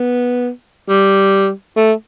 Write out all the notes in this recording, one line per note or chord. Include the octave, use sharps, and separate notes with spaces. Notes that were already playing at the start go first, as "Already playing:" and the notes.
Already playing: B3
G3
A3